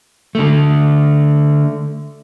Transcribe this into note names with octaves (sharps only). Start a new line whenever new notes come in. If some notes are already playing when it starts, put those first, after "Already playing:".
D3 A3